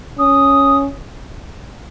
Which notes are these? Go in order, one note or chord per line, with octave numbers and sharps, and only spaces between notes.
C#4 D#6